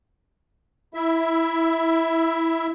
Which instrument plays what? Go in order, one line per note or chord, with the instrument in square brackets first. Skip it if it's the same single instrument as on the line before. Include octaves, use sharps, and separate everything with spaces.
[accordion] E4 E5